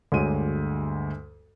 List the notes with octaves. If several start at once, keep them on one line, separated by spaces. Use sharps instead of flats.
D2 G2 G#3 F#4 C#5 D#7